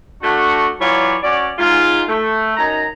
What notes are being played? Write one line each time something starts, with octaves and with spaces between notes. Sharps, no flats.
A3 D4 F#4
E3 F#3 F4 C#5 D5
C#4 F#4 D5
G#2 F4
A3
F#2 D#4 A#5